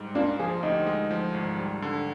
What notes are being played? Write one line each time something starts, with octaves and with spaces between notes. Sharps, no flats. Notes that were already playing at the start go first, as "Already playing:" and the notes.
Already playing: G#2 G3
A#3 D4 F4
F3 F4 G#4
D2 D#4 G4
G#3
F3
G#1
G3
D3